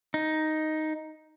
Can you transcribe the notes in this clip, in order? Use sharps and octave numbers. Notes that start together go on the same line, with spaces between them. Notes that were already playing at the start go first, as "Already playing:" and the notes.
D#4